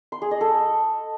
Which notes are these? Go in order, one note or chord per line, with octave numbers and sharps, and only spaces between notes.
C6
G#4
D#5
A4